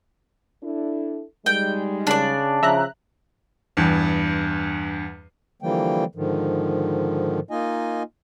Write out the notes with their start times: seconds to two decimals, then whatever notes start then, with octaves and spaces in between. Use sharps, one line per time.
0.63 D4 E4 A4
1.46 G3 G#3 D#4 G5
2.07 C#3 D4 D5
2.63 C#3 F3 E5 A#5 F#6
3.77 E2 G2
5.62 D3 E3 F3 G3 A#3 G5
6.15 G#2 D3 D#3 F3
7.51 A#3 D#4 F4 D#5 G#5